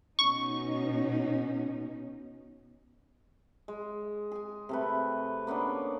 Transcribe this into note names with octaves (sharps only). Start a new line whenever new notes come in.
B2 C#4 D#4 C#6
G#3
G#4 G#5
C3 A3 B4
A#3 B3 C#4 D4